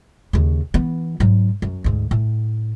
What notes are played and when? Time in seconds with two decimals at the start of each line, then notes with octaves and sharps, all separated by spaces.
0.33 D#2 C#3
0.74 E3 B3
1.20 G#2 F#3
1.62 F#2
1.84 D2 G#2
2.11 A2